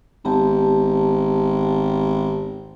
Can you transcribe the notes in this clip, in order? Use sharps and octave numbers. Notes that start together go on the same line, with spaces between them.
G#1 B3 G4 A5